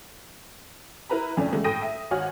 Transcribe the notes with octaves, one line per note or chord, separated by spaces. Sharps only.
E4 A#4 B4 A#5 B5
F2 C#3 A3 C#4 D4
E2 C#3 G#3 A3
A2 A4 G5 D#6 A#6 D#7
E5
G#1 F#4 C#5 F#5 G#5 F6